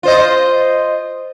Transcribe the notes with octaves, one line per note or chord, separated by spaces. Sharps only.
F4 C5 D#5